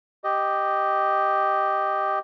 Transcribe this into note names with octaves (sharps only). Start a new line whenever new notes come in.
G4 D#5